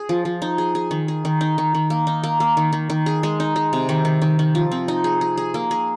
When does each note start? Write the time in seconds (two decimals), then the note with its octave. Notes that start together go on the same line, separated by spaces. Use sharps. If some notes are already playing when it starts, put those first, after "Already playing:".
Already playing: G#4
0.09 F3
0.25 F3
0.42 D#4
0.58 G#4
0.75 G#4
0.91 D#3
1.08 G#4
1.25 D#3
1.41 D#4
1.58 D#3
1.75 D#3
1.90 A#3
2.07 D#4
2.24 A#3
2.40 A#3
2.57 D#3
2.73 D#3
2.90 D#3
3.06 G#4
3.23 G#3
3.40 D#4
3.56 G#3
3.73 C3
3.89 D#3
4.05 D#3
4.22 D#3
4.39 D#3
4.55 F3
4.72 C4
4.88 D#4
5.04 G#4
5.21 G#4
5.37 G#4
5.54 A#3
5.71 G#4